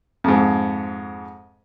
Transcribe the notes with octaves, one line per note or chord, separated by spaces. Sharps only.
F2 G#2